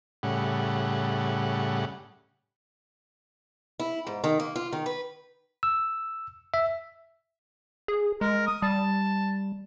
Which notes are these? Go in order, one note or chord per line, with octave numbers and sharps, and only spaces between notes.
A2 C#3 G3 F#5
E4
G#2
D#3
A#3
F4
D#3
B4
E6
E5
G#4
G#3 A#4
D#6
G3 A5